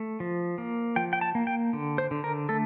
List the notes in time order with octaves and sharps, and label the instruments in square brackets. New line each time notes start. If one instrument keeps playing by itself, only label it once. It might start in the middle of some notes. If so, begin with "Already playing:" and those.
Already playing: [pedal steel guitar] A3
F3
A#3
F3 G5
G5
A5
A#3
G5
D3
C5
D3
A#4
A3 A4